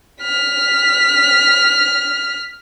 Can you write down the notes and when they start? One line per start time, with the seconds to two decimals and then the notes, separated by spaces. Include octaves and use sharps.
0.22 F6 B6